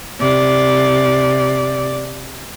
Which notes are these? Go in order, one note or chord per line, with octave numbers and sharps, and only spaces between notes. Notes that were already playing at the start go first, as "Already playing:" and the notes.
C3 D5